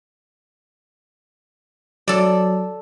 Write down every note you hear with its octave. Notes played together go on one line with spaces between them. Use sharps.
F#3 A4 D5